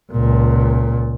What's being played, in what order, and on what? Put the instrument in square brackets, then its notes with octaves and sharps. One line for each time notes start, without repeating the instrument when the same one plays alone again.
[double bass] C#2 A#2